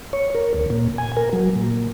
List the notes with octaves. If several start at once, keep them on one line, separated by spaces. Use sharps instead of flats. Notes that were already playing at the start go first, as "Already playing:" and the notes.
C#5
A#4
D2
A#2
G#5
A#4
F#3
A#2